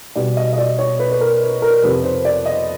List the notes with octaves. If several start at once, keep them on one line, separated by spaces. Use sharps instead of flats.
B2 G3 B3 D5
D#5
D#5
D5
C#5
B4
B4
A#4
B4
A#4
F2 C3 F3 B4
C5
D5
D#5